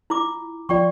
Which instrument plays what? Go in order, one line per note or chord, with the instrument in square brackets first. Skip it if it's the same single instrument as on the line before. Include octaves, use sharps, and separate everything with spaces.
[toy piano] E4 F4 D6
[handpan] F3 F4 [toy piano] D5 G5 C#6